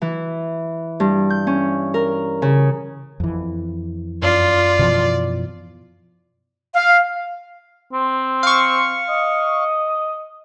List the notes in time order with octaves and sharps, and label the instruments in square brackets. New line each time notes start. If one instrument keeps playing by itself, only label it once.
[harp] E3
G2
G6
C#4
A#4
C#3
[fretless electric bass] F2 E3
[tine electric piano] F#2 [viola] F4 [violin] D5
[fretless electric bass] B2 E3 F3
[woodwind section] F5
[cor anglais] C4
[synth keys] F5 C#6
[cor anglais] D#5